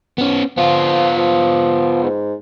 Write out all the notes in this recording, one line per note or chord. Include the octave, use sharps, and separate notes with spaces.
B3 C#4
F3 B3 F4
F3
G#2